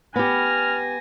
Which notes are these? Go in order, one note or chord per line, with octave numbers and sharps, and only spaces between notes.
B3 G4 G#5 F6 A#6